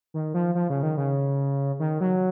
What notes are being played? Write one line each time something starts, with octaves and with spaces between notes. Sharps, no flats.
D#3
F3
F3
C#3
D#3
C#3
D#3
F#3